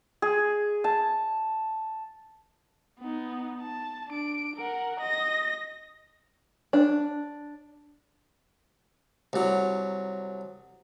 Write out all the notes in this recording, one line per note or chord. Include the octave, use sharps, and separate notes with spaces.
G#4
A5
B3 D#4
A5
D4 D7
A#4 F#5
D#5 A#6
D4
C2 F#3